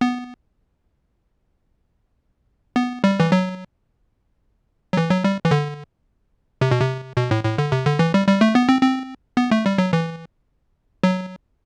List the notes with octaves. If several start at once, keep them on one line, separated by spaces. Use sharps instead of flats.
B3
B3
G3
E3
F#3
F#3
E3
F#3
G3
E3
D3
C3
B2
C3
B2
A2
A2
D3
C3
D3
E3
G3
G3
A3
B3
C4
C4
B3
A3
G3
F#3
E3
F#3